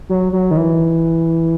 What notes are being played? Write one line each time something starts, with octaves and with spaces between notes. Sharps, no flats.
F#3
F#3
D#3
E3